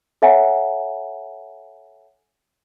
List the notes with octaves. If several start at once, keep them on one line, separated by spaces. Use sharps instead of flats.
A4 C#5 E5 F#5 G#5 A#5